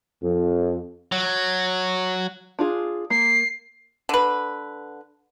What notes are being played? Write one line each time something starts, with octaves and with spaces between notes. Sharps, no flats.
F2
F#3
D4 F4 G#4
A#3 C7
D3 B4